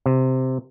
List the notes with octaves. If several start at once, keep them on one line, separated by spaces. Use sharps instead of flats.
C3